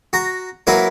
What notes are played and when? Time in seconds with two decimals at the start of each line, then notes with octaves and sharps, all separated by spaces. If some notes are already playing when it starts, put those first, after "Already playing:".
0.13 F#4 A#5
0.67 F#3 A#3 E4 A#4 B4